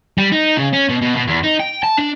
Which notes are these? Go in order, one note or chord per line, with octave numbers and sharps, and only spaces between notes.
G3
D#4
C#3
C#4
B2
B2
B2
E2
D#4
G5
A5
D4